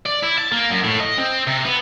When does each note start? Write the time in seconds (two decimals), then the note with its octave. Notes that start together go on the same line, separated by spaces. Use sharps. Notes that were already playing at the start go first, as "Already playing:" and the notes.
0.06 D5
0.23 E4
0.38 A5
0.52 A#3
0.70 F#2
0.84 A2
1.00 D#5
1.18 C4
1.48 C3
1.66 B3